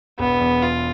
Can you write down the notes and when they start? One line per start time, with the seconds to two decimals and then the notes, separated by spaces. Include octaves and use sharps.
0.19 E1 B3
0.40 E2
0.62 E2 F4